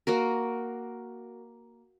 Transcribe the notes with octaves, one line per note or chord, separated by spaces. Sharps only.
A#3 F#4 A#4